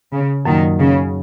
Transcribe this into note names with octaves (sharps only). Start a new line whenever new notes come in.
C#3
F#2 A#2 D#3 F#3 D#4
C#3